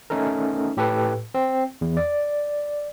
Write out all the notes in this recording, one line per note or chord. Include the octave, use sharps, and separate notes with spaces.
A3 C#4 D#4 A4 A#4
A2 G4 A4 B4
C4
E2
D5